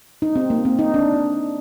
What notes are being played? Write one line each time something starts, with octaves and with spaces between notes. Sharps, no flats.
D#4
C4
A#3
C4
D#4
D4